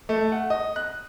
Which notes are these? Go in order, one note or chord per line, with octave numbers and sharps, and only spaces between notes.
A3
F#5
D#5
F#6